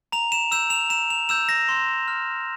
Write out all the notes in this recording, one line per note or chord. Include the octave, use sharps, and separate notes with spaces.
A#5 F7
E7
E6 G6 E7
F7
A#5 E7
F7
E6 G6 E7
A#6
C6
F6